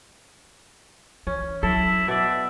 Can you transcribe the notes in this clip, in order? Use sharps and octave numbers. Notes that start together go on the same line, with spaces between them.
E3 C#4
F#3 E4 A4
B2 D5 E5